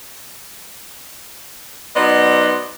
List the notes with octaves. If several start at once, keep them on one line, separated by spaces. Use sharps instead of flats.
F#3 B3 D#4 C5 D5 D#5